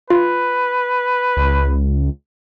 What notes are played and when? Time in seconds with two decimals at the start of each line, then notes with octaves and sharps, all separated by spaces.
0.10 F4 B4
1.37 C#2